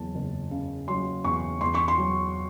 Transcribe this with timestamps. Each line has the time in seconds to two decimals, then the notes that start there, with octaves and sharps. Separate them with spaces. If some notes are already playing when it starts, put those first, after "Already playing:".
Already playing: F#1 E2 F#3 A5
0.15 F#1
0.51 C#3
0.88 F#3 C6
1.24 E2 C#6
1.61 E2 C6
1.75 C#6
1.88 C6
1.98 F#3